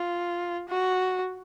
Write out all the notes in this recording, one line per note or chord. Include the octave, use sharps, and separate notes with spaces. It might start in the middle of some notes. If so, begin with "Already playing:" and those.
Already playing: F4
F#4